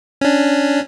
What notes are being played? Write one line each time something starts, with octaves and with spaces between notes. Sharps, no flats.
C#4 D4